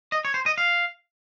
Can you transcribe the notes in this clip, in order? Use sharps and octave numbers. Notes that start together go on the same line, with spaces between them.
D#5
C#5
C5
D#5
F5